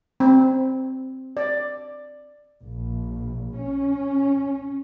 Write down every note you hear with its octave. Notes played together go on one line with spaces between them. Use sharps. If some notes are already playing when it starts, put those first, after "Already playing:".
C4
D5
A#1
C#4